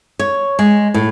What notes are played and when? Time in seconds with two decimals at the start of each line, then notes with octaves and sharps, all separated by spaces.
0.19 C#5
0.59 G#3
0.94 A2